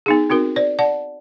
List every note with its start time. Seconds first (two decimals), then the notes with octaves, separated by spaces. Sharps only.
0.06 B3 D#4 G#4
0.30 C4 D#4 F#4 A#4
0.56 C5 D5
0.79 D5 F#5 A5